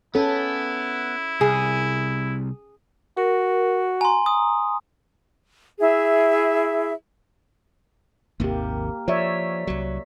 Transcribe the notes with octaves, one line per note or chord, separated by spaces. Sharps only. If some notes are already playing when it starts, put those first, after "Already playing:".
B3 C#4 E4 A4
C2 G#4
F#4 A#4
G#5 A#5 C6
D#6
E4 G#4 E5
G#1 D#2 C3 A#3 G4
F3 C#5 D5 E5
C2 F#3